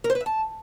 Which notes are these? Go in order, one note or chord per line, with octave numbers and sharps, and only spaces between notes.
A#4
C5
B4
E5
A5